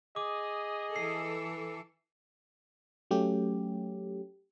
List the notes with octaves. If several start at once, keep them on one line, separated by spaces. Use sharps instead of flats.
G#4 D#5 D6
E3 A4 C7
F#3 A3 C#4 G4